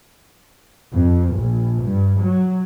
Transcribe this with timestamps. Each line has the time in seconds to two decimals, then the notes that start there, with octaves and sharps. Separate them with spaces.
0.93 F2
1.35 A#1
1.83 G2
2.21 F#3